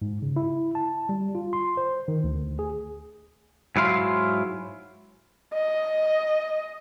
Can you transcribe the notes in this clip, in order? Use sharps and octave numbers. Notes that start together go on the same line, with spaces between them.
G#2
C#3
E4
A5
G3
F4
C6
C5
D#3
D2
G#4
G#2 F#3 E4 F5 C6
D#5